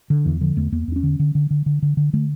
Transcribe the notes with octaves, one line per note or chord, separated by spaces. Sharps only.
D3
E2 E3
D3 F3
E2 A3
E2 A#3
E2 D4
C#4
D3
D3
D3
D3
D3
D3
D3
D3 A3